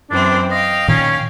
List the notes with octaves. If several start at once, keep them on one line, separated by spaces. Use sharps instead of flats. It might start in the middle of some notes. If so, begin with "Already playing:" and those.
F#2 E3 C4 D4
D#5 F5 G5
A#2 D#3 C#4